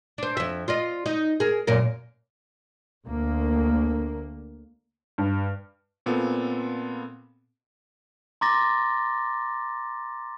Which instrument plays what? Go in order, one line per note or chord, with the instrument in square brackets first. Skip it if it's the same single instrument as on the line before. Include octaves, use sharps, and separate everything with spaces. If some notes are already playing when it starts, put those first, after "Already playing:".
[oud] D4 C5
F2 E5
F4 D5 D#5
D#4
G#4 A#4
F#2 A#2 A#4
[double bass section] D2 A#3
[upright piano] G2
[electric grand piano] A#2 B3 C4 F4 A4
[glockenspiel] A#5 C6 D6 A6 A#6